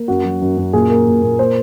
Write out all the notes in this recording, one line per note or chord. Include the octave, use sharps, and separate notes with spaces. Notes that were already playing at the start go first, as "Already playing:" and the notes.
Already playing: A#3
F#2 F#4
F#3
F#2
F#2
A#2 G#4
A#3
A#2
A#2
A#3 C5